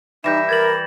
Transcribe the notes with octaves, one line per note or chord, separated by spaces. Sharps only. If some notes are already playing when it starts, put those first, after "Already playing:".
E3 G3 D#4 E5 G6 A#6 E7
A#4 G#6 A6 F#7